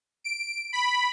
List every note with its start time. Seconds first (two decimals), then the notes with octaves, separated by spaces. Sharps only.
0.24 D7
0.73 B5